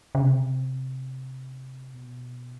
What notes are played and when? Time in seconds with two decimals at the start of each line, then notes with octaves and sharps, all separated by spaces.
0.15 C#3
0.22 C3
1.94 B2